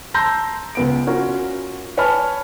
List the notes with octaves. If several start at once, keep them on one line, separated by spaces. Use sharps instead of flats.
A5 A#5 C6 E6 G6 A#6
C#2 B3 D7
C#4 F4 F#4 A#4
B4 C#5 G#5 A5 B5 F6